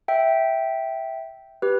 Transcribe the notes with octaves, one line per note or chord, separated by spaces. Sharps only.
E5 G5
G4 B4